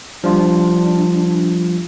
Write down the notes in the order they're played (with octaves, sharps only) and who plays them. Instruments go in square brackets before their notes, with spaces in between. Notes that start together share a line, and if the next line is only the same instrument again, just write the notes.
[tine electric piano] F3 G3 F4 [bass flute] D4